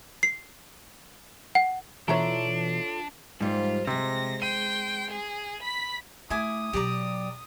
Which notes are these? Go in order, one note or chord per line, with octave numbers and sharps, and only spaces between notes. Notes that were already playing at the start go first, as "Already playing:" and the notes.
C7
F#5
B2 E3 D4 F4 A4 C#5 E5 A#5
G#2 F3 G3 A#3 F4
C3 G#3 C4 A#6
G5 C6 D#7
G#4
B5 B6
A3 E4 G#5 D6 D#6
B2 F#3 G4 D5 A#5